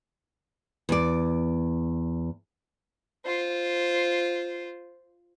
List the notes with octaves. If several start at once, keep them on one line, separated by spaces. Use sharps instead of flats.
E2 D5
F4 C5